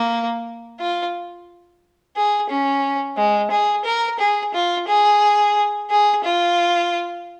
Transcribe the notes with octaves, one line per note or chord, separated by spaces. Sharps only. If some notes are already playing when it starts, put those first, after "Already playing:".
Already playing: A#3
F4
G#4
C#4
G#3
G#4
A#4
G#4
F4
G#4
G#4
F4